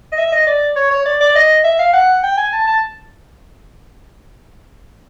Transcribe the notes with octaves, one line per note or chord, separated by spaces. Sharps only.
D#5
E5
D#5
D5
C#5
C#5
D5
D5
D#5
E5
F5
F#5
G5
G#5
A5
A5